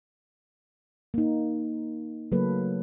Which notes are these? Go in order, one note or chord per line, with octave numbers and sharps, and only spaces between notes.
A#3 D#4
C#3 F#3 A3 A#3 A4 B4